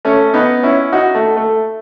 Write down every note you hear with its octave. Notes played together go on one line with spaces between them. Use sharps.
A3 C#4
B3 D#4
C#4 E4
D#4 F#4
A3
A3